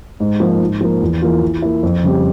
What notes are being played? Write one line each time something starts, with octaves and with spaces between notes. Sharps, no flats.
G#2
F3 A#3
G#2
F3 A#3
E2
E3 A#3 F4
E3
A#3 E4
F2
C#3 G3 C4 G4